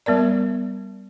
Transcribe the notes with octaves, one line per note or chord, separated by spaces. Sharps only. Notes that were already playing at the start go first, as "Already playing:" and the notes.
G3 B3 A#4 D5